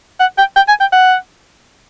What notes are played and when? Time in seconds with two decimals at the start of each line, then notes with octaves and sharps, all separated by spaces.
0.20 F#5
0.38 G5
0.56 G5
0.68 G#5
0.80 G5
0.92 F#5